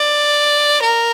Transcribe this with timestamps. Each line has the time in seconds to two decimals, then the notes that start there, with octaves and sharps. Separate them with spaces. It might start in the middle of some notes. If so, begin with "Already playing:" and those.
Already playing: D5
0.82 A#4